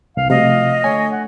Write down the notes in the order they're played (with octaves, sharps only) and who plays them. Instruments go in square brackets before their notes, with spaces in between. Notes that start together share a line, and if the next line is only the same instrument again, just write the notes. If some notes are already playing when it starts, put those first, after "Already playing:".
[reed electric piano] C2 [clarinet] F5
[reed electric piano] C3 [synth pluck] F3 A3 F#4 [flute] D#5 [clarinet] F5
[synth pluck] F3 F4
[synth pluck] D3 A3 [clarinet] C#5 [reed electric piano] G#5
[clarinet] F#5